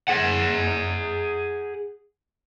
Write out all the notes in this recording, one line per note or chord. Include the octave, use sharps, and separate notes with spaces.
G#4 F#5